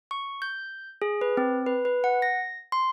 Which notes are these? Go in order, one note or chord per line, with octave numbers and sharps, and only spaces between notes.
C#6
G6
G#4
B4
C4
B4
B4
F#5
A#6
C6